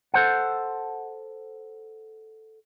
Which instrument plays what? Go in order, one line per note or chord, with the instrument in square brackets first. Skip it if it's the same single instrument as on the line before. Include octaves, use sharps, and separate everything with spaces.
[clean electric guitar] A4 C5 F#5